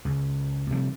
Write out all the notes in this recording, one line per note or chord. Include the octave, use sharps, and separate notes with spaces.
C#2
C3 F3 G3